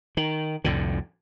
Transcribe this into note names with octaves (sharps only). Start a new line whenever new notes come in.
D#3
C2 F2 A2 D3